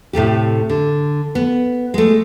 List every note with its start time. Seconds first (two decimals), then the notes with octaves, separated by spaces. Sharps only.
0.13 A2 C3 A3 G4
0.70 D3
1.35 B3
1.94 G#3 A3